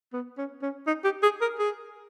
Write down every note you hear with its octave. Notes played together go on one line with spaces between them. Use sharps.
B3
C#4
C#4
D#4
G4
G#4
A#4
G#4